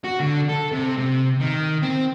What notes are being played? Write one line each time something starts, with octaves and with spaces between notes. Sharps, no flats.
F#4
D3
A4
C3
C3
D#3
C4